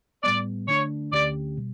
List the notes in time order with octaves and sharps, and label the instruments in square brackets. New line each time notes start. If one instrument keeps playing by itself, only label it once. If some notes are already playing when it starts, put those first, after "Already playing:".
[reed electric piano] A2 G3 B3 [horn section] D5
[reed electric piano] D3 A3 D4 [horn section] C#5
[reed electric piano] D2 D3 A3 C#4 G4 [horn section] D5
[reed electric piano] B2 G3